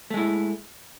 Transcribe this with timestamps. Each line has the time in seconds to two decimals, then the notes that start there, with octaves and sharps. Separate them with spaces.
0.10 A3
0.14 G#3
0.17 E4